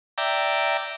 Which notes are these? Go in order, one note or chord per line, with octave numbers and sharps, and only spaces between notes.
D5 E5 G5 A#5